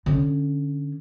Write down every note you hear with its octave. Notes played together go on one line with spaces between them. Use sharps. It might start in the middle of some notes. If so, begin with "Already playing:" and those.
D3 C#4